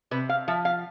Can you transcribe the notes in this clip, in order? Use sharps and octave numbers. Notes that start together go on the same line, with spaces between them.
C3 B4
F5
F3 E5
F5